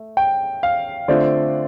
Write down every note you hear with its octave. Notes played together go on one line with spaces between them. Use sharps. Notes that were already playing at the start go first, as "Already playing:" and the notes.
Already playing: A3
G5
F5
D3 A3 C4 F4 D5